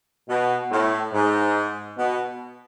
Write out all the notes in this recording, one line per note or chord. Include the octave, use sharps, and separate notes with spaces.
B2
A2
G#2
B2